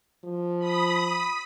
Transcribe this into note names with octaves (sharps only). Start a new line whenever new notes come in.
F3
B5 D#6